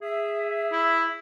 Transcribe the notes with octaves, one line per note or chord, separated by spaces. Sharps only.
G#4 E5
E4